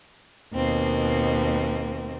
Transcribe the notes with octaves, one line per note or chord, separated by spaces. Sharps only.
D#2 B2 A#3 C4